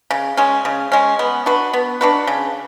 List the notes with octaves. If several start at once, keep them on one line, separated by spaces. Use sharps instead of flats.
C#3
G#3 C#4
C#3
G#3 C#4
B3
D4 F#4 B4
B3
D4 F#4 B4
C#3